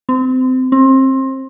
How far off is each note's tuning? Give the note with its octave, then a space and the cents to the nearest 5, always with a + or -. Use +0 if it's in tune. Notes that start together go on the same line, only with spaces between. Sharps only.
C4 -30
C4 +25